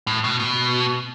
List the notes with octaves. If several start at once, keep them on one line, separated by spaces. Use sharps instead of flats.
A2
B2
B2